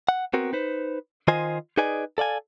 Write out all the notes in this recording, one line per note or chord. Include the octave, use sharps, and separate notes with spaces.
F#5
B3 C4 F#4 A#4
D#4 B4 C5
D#3 F4 C5 D#5 G#5
D#4 G#4 B4 D5 D#5 G#5
A4 D5 F5 G#5